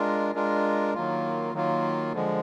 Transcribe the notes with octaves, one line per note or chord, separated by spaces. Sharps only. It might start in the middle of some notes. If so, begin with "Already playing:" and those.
Already playing: G#3 D4 F4 A#4
G#3 D4 F4 A#4
D#3 F#3 A#3 F4
D#3 F#3 A#3 F4
D3 F3 G#3